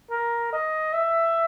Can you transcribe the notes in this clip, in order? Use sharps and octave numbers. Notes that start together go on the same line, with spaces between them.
A#4
D#5
E5